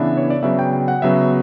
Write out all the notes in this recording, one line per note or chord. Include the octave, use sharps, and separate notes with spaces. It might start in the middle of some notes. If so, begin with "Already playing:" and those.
Already playing: C#3 E3 B3 D4 E5
C#5
D5
C#3 F#3 B3 E5
G5
G5
F#5
C#3 F#3 B3 E5